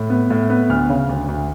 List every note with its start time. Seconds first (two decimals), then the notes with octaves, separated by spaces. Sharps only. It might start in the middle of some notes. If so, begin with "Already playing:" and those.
Already playing: A2
0.10 B3
0.30 A2
0.50 B3
0.69 D2 F6
0.90 C#3
1.09 D2
1.28 D2